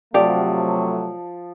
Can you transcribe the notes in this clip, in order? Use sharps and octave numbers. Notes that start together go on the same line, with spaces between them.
C3 F3 F#3 A3 G4 D5